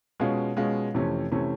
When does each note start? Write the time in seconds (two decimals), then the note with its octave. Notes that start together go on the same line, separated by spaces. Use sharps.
0.20 B2 G#3 C#4 F4
0.57 B2 G#3 C#4 F4
0.94 F2 C3 E3 A3 C#4
1.31 C3 E3 A3 C#4